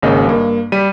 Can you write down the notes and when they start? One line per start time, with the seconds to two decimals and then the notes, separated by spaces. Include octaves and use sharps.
0.02 G#1 C#3 A#3 D#5
0.27 G2 A#3
0.72 G3 B6 D#7